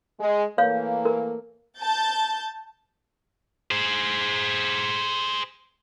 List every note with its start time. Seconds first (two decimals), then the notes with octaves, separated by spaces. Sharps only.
0.19 G#3
0.58 E3 A3 A#3 C#5 F5
1.05 A#4
1.80 A5 G6 A6
3.71 G#4 C5